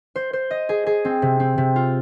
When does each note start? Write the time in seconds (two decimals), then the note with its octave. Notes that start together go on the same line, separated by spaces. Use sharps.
0.16 C5
0.33 C5
0.51 D#5
0.69 G#4
0.86 G#4
1.05 C4
1.22 C3
1.40 C4
1.58 C3
1.76 F4